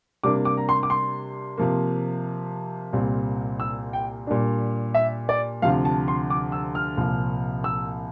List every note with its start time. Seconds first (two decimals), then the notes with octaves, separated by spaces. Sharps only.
0.24 C3 G3 A#3 D4 D6
0.45 D6
0.57 A#5
0.69 C6
0.83 D6
0.90 C6
1.58 C3 F3 A#3
2.93 C2 A#2 G3 C4
3.60 E6
3.93 G5
4.27 A#2 G3 A#3 D4
4.94 E5
5.29 D5
5.62 D2 C3 F3 F5
5.85 A5
6.08 C6
6.30 D6
6.52 E6
6.75 F6
6.97 C2 A#2 F3
7.64 E6